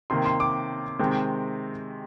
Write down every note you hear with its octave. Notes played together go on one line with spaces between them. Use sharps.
C3 D#3 A#3 C6
C6
D6
C3 D#3 G#3 C4